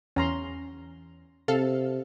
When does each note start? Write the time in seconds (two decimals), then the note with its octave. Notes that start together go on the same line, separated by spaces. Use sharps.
0.16 E2 C#4 A#5 C6
1.48 C3 A4 F5